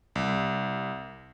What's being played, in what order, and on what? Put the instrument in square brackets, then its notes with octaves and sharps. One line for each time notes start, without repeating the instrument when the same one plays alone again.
[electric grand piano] C2